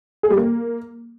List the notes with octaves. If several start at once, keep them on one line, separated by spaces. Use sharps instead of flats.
G#4
G3
A#3